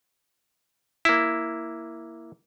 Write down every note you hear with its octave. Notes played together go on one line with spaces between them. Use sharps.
A#3 E4